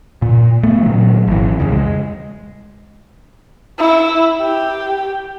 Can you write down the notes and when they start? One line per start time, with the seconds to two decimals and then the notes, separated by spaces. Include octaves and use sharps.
0.22 A#2
0.63 A3 B3
0.83 A#2 D#3 F#3
1.27 G#1 E3
1.60 C2 F2 C#3
1.72 G#3
3.79 E4
4.43 G4